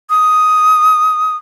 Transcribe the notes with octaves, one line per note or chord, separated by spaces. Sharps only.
D#6